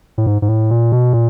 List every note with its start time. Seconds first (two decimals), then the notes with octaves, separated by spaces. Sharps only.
0.18 A2
0.26 G#2
0.42 G#2
0.49 A2
0.71 A#2
0.92 B2
1.13 A#2